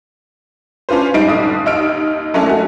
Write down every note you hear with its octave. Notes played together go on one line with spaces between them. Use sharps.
C#4 D4 F4 B4 C5
G#2 G3 D#4 C7 D7
F1 B1 D3 D#6
D#2 D#4 E6 F6 D7
F#3 G#3 A3 C#4 D4 E4
A3 C#4 F#4